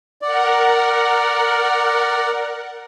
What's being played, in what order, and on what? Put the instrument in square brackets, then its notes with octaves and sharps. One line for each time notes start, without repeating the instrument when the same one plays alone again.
[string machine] A#4 F#5 [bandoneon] D5